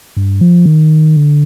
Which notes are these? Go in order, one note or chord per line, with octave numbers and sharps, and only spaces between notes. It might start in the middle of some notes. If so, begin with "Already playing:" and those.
G2
F3
D#3
D3